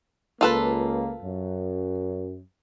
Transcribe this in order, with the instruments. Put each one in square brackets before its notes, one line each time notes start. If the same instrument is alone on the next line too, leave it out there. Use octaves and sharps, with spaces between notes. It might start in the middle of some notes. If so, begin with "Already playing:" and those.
[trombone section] C#2 A#3 [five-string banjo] F4 A4 B4
[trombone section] F#2